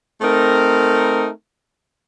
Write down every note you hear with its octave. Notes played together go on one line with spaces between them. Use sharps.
A3 C4 D#4 A#4